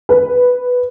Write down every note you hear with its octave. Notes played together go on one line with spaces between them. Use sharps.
B4